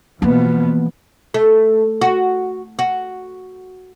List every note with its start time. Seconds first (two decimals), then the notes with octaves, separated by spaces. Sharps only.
0.22 B2 E3 F3 A#3 B3
1.34 A3
2.01 F#4
2.79 F#4